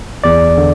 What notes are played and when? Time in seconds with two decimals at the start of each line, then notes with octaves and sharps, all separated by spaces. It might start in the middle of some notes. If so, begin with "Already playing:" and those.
0.24 E2 D5
0.58 D3